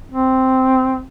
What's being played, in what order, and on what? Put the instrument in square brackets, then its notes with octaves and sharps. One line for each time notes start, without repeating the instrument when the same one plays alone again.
[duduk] C4